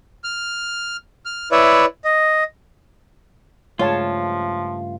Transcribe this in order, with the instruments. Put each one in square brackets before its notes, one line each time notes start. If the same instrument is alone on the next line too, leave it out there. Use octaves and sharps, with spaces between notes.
[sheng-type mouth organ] F6
F6
E4 B4 C#5 D5 E5
D#5
[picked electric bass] G2 C#3 A3 [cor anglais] F3 [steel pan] G#3 C#5 A5 [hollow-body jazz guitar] F4